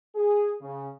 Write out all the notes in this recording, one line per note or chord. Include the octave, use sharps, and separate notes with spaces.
G#4
C#3